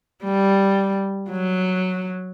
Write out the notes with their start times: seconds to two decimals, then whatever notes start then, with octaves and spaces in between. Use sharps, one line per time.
0.24 G3
1.30 F#3